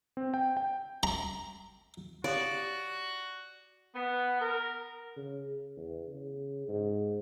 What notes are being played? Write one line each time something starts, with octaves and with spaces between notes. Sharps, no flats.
C4
G5
G5
A#5
F#4 G4 C#5 D5 F5
B3
A#4
C#3
E2
C#3
G#2